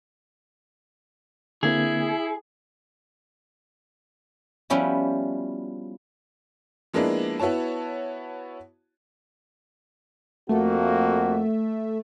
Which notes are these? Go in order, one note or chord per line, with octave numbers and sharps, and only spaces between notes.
D3 A#3 C4 E4 G#4
F3 G3 B3 C#4 E4 F#4
F3 G#3 A#3 B3 D4 E4
B3 E4 F#4 C#5 A5
F2 A3 A#3 F#4